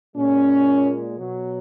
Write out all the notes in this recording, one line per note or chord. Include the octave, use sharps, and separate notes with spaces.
A#2 G#3 C#4
B2 F#3